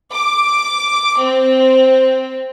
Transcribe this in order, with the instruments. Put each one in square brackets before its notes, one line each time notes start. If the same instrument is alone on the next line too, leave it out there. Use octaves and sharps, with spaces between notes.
[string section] D6
C4